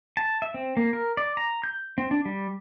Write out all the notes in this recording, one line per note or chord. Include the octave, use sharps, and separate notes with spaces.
A5
E5
C4
A#3
A#4
D5
A#5
G6
C4
D4
G3